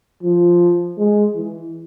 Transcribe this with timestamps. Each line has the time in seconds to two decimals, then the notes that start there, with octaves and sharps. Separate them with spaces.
0.23 F3
0.97 G#3
1.35 E3